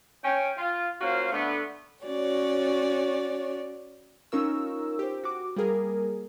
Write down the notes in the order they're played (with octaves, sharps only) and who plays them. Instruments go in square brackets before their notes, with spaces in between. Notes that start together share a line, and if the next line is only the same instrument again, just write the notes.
[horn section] C#4 G5
F4
A#3 C#4 F4 F#4 C5 F5
D3 A3 B3
[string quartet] C#4 F#4 C#5 D5
[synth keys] C#4 D#4 F4 A#4 C#6 E6
G4 C5
F#4 D6
G3 A#3 G#4 A#4